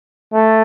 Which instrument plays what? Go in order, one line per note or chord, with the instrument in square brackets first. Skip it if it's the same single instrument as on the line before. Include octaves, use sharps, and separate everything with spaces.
[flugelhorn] A3